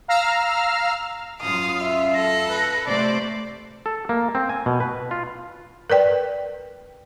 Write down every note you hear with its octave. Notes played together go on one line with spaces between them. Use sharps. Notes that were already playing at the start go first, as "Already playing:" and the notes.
F5 A#5 E6 F6
F#2 F4 F5 D#6
E5
A4 A#6
B4
C3 A3 C5 D5
A4
A#3
C4
G#5
B2
B4
F4
A#4 B4 D5 G5